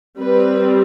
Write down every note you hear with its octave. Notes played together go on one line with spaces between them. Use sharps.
G3 C4 B4